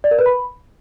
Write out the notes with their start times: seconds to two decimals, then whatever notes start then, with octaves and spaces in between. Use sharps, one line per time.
0.04 D5
0.11 A#4
0.19 B4
0.26 B5